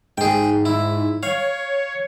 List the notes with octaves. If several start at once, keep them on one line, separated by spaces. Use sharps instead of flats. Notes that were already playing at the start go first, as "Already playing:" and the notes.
G#2 G#4 G5
E4
C#5 F5